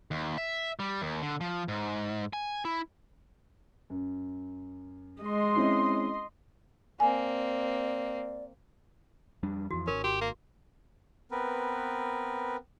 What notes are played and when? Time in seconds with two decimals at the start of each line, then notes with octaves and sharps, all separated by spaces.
0.11 D#2
0.38 E5
0.79 G3
1.02 D#2
1.22 D3
1.41 F3
1.68 G#2
2.33 G#5
2.65 E4
3.90 F#2
5.22 G#3 D#5 C6
5.55 C4 C#4 E4
7.00 A#3 C4 D5 G#5
9.43 F2 G3 D4
9.71 F2 E3 F#4
9.88 G#1 C#4 A#4
10.04 F#4 G4
10.21 A#3
11.31 B3 C4 A#4 B4